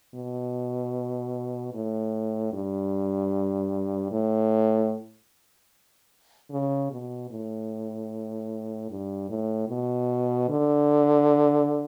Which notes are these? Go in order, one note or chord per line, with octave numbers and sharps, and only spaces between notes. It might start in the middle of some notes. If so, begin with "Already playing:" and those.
B2
A2
G2
A2
C#3
B2
A2
G2
A2
B2
D3